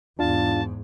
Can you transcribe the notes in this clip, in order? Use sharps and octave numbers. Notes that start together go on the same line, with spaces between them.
E2 G#2 D4 F4 F5 A5